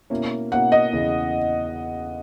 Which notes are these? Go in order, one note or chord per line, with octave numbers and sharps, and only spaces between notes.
B2 A#3 C#4 E4
B2 A#3 C#4 E4 F#5
D#5
E2 C#3 E3